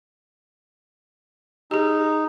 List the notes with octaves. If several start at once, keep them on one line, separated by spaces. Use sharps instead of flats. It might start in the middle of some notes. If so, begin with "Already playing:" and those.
D#4 G4 G#4